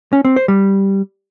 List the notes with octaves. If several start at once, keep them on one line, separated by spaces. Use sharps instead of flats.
C#4
C4
C5
G3